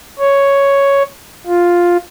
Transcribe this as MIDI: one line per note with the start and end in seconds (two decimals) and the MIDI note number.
0.19 1.03 73
1.47 1.97 65